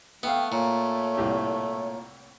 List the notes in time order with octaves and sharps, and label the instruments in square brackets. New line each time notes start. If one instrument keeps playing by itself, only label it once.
[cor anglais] A3 [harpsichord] B3 [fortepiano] E5 F5 [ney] G5
[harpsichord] A#2 [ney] C#5
[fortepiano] C2 A2 G4